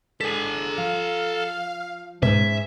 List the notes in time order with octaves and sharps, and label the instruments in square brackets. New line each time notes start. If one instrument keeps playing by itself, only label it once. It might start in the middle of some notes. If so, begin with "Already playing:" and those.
[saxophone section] D3 G#3 [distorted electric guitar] A4 G#5 [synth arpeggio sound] B6
[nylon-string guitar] F3 [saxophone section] F5
[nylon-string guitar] G#2 C#4 D#4 [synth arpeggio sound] B2 [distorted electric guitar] E5